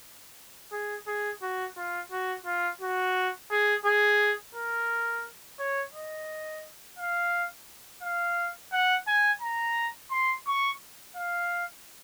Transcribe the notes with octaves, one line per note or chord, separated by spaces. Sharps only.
G#4
G#4
F#4
F4
F#4
F4
F#4
G#4
G#4
A#4
C#5
D#5
F5
F5
F#5
G#5
A#5
C6
C#6
F5